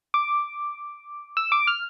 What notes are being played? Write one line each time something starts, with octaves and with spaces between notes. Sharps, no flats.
D6
E6
D6
F6